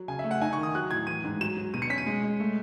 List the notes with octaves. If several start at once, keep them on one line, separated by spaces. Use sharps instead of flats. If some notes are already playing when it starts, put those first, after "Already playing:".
Already playing: F#3
C#3 G#5
E5
A3
F#5
D#4 G#5
D#3 C#6
D#6
F#3 F#6
A2 G#6
E3 D#7
G#2
F#3 E7
F#3
B2 D#7
C#7
C#4 B6
D#7
G#3
G#3
A3